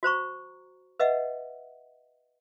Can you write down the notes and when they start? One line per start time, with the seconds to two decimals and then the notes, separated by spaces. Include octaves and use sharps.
0.03 F#4 C5 A#5 C#6
1.00 B4 D#5 E5 F#5